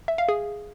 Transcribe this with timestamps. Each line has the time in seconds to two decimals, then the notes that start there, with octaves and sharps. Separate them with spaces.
0.08 E5
0.18 F5
0.29 G#4